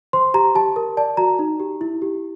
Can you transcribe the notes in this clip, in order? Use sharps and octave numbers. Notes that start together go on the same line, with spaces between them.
C5 C6
G4 A#5
G4 A5
A#4
D5 A5
F#4 A#5
D#4
G4
E4
G4